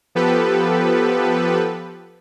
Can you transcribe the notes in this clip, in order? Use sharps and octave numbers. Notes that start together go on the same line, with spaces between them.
F3 B3 G4 A4 B4